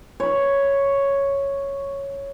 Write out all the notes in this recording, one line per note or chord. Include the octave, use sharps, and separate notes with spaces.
C#5 B5